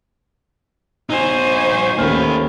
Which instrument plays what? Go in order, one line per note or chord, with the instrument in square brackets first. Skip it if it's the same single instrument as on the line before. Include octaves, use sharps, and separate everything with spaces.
[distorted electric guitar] D#4 F#4 [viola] C5 G#5
[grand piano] D#2 C#4 F6 [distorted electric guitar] A3 B4